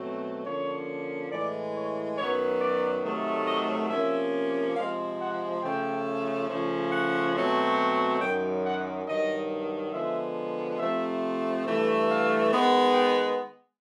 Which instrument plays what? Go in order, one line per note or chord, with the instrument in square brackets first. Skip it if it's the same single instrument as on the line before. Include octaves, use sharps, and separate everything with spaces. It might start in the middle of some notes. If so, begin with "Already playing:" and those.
Already playing: [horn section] B2 F#3 A3 C4
D3 F3 A#3 C#4 C#5
A2 E3 G#3 D5
C#5
F#2 D#3 F#3 B3 C#5
D5
C3 D#3 F#3 A3
D#5
C3 F3 A#3 C#4 E5
C3 F3 G#3 C4 F5
F#5
C#3 F3 A3 C#4 G5
C#3 F3 A3 C#4
F#5
B2 F#3 A3 C4
F#2 D#3 F#3 G5
F#5
G2 D#3 F#3 D#5
D3 F3 G#3 B3 E5
C3 F3 A3 C4 E5
G2 E3 A3
F5
D#3 G#3 B3
G5